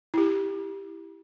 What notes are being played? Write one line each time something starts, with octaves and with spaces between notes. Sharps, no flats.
E4 G4